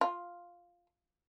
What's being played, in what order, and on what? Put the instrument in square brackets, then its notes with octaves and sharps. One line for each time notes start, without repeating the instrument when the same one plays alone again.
[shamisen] F4